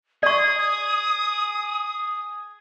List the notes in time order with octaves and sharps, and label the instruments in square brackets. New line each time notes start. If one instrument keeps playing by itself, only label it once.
[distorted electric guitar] G#4 [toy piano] D5 C#6 [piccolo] D#6